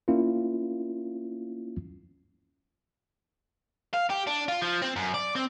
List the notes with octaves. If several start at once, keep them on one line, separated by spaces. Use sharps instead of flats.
A#3 C#4 E4 F4
F5
G4
D4
F4
F3
C4
F#2
D5
C4